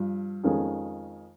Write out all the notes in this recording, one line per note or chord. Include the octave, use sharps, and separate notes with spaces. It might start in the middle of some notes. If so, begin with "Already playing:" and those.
Already playing: G2 F3
F2 D#3 G#3 C#4